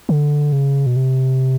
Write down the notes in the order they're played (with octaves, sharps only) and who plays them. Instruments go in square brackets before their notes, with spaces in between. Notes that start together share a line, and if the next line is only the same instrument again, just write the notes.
[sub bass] D3
C#3
B2
C3